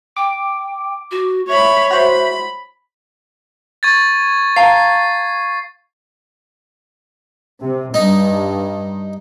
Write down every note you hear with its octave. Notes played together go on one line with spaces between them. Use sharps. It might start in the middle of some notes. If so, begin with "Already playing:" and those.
G5 D6
F#4
C#5 E5 B5
F#4 C5 B5
C#6 G#6 A6
F5 A5 A#5 C7
C3
G2 D#4